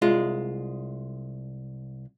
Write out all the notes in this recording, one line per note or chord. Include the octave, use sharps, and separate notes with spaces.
C2 G#3 F4